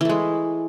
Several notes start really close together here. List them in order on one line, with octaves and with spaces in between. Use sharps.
E3 A3 G#3